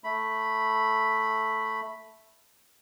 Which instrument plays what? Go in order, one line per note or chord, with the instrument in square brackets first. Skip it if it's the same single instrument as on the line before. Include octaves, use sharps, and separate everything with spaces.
[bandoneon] A3 B5